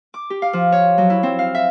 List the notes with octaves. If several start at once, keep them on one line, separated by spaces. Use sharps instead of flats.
D6
G4
F5
F3
C#5
F#3
E4
C4
F5
E5